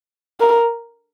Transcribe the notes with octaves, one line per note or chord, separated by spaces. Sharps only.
A#4